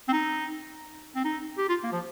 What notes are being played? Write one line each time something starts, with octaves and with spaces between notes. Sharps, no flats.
C4
D#4
C4
D#4
G4
F4
A#3
F3